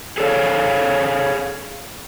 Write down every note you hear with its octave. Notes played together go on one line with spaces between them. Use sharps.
G#4 A4 C#5 F5